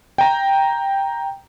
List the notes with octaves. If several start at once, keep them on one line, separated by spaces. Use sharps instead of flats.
G5 A#5